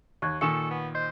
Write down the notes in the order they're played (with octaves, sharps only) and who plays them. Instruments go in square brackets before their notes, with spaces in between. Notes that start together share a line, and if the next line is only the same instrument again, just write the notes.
[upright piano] D#2 [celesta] C#6 F#6 G#6
[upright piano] A#2 D#3 E7 [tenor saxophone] A4 [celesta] G#5 C#6 C#7
[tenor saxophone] B3
[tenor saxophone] C5 [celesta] D#5